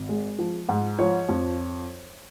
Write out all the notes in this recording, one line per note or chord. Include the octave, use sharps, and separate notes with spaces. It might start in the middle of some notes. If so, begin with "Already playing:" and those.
Already playing: G#1
G#3
F3
G#2
F3 C#5
F2